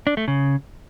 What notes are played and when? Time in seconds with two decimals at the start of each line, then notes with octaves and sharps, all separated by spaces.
0.07 D4
0.17 A3
0.28 C#3